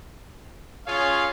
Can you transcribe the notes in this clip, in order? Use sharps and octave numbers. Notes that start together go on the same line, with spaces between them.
C#4 F4 G#4 C#5 F5